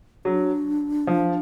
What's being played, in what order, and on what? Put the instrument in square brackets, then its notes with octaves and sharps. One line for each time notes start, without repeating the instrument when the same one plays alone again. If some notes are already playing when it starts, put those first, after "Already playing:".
[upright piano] F#3 [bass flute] D4
[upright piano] F3